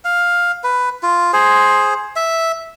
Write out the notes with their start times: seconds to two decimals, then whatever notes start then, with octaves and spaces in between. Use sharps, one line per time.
0.05 F5
0.64 B4
1.03 F4
1.33 G#4 C5
2.16 E5